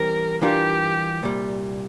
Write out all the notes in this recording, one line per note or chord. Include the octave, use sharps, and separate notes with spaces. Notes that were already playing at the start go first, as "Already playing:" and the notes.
Already playing: E3 G3 C4 A#4
E3 G3 D4 F4 G4 A#4
C2 A#2 G3